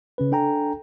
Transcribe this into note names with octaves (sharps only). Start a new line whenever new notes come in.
C#3 C#4 B4
D4 A4 G5 G#5 A#5